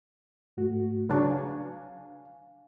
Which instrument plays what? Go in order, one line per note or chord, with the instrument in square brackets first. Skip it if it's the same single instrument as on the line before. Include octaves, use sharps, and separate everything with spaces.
[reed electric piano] G#2 A3 F#4
[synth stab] C#3 F#3 D4 [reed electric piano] B4 A#5 C#6
[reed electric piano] F5 G#5